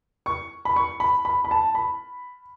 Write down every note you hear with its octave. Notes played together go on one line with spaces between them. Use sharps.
C#6
B5
C#6
B5
B5
B5
A5
B5